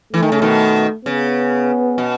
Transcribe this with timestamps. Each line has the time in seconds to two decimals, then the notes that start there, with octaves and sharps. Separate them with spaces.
0.13 E3 A3
0.23 D#3
0.32 C#3
0.42 B2 D#3
1.05 C#3 B3
1.98 B2